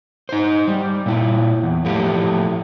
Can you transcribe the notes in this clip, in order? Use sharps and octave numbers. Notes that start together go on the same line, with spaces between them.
D#4 C5
G3
A#2 E4
E2
A2 F3 A3 G4